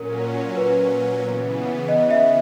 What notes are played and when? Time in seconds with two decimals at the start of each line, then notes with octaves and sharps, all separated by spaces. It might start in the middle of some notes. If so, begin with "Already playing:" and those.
Already playing: A#2 F#3 C#4 A#4
0.13 A#4
0.57 B4
1.23 C#3 E3 B3
1.88 D#5
2.11 E5